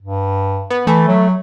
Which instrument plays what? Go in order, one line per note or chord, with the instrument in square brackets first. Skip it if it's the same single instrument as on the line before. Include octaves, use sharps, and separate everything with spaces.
[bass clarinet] G2
[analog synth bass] B3
[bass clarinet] E3 [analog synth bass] A3
[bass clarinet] F#3